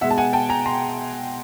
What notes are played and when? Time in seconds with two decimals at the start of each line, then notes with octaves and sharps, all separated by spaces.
0.01 B2 G#3 B3 E5 F#5
0.10 A5
0.18 F#5 G#5
0.33 G5 A5
0.49 G#5 A#5
0.66 A#5 C6